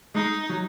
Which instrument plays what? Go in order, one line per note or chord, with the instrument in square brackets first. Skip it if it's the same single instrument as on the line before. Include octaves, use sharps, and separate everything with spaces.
[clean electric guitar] G#3 [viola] D#4
[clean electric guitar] F#3